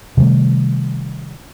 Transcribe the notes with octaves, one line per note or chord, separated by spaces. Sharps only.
C3 D#3 G3 A3